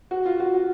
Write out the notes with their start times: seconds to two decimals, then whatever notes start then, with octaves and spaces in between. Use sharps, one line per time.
0.11 F#4
0.26 F4
0.40 F#4
0.54 F#4